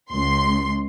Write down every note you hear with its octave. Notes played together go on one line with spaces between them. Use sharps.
C#2 C6